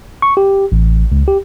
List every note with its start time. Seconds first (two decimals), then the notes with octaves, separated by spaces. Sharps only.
0.22 C#6
0.37 G4
0.72 A1
1.12 C#2
1.28 G4